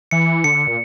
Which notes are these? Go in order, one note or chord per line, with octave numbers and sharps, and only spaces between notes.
E3 C#7
D3 C#7
A#2